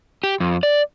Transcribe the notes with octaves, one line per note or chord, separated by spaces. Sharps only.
G4
F2
D5